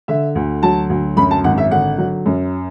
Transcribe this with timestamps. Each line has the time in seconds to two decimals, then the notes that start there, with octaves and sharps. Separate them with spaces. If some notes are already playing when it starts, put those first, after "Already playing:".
0.08 D3 E5
0.35 D2
0.63 F#3 A5
0.90 D2
1.17 F#2 B5
1.31 A5
1.44 G#1 F#5
1.58 E5
1.71 D3 F#5
1.98 F#3
2.26 F#2